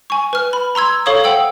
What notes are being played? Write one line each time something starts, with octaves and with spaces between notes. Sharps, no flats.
G#5 C#6
B4 F6
B5
A#5 C6 E6 G#6
A4 C#5 F5 C#6 D#6 G#6
C5 F#5 G5 E6 F#7